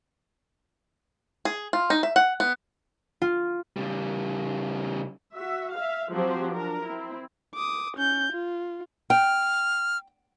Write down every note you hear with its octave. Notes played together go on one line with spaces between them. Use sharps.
G#4
F4
D#4
E5
F#5
B3
F4
C#3 G3
F#4 E5
E5 F5
F3 F#3 C4 G4 C5
D4 A#4
C4 E4
D6 D#6
C#4 G6
F4
G5 F6